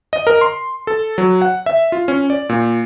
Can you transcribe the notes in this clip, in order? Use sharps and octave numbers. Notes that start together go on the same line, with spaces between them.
D#5
A#4
C6
A4
F#3
F#5
E5
F4
C#4
D5
A#2